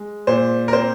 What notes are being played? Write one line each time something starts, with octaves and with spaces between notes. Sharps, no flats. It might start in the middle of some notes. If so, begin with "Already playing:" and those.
Already playing: G#3
A#2 C5
A#4
C4 C5